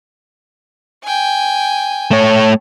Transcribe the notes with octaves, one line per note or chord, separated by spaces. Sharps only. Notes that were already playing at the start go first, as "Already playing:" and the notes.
G5 G#5
A3 C#5